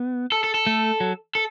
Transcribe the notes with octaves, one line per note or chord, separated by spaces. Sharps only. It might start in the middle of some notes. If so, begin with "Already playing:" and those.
Already playing: B3
A4
A4
A4
A3
F#3
A4